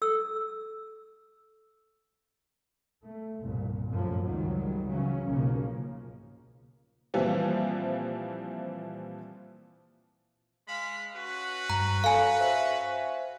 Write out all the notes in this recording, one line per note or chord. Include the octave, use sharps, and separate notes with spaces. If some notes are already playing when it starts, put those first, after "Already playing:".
A4 E6
A3
G1 C2 A#2
F#2 A2 C3 F3
C#2 G#2 D#3 F#3 G3
C#3 E3 F#3 C#4
B1 G#2 C#3 F3 A#3 C#4
A#2 E3 F3 G3 C4
G#3 F5 B5
C#4 F#4 B4
G2 A#5
A4 C#5 F5 G#5 B5
C5 E5